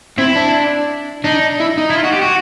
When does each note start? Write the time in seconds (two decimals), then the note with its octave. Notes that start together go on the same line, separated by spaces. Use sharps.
0.18 C4 E4
0.36 D4
1.24 D4 D#4
1.60 E4
1.78 D#4
1.90 E4
1.95 F4
2.04 F#4
2.12 G4
2.21 F#4